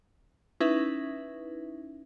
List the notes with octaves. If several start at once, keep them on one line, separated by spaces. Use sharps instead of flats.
C#4 D#4 E4 B4 E5